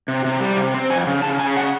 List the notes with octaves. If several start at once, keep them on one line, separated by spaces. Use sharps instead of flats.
C3
C3
G3
C3
C4
F2 G#5
C#3
C#3 A5
C#3 G#5
F#5